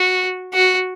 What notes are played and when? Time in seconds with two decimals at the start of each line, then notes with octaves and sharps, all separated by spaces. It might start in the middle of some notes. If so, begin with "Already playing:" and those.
Already playing: F#4
0.54 F#4